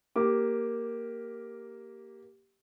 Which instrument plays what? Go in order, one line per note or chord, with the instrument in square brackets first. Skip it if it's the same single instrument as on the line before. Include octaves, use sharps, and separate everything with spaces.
[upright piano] A#3 G4 D6